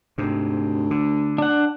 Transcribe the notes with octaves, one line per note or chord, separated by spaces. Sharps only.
D2 G#2 C3
D3
D4 F#5